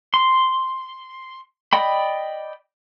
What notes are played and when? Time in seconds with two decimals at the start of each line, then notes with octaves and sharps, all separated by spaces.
0.14 C6
1.73 D5 D#5 G5 B5